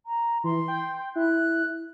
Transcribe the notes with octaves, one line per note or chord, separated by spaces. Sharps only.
A#5
E3 C6
G5
E4 F#6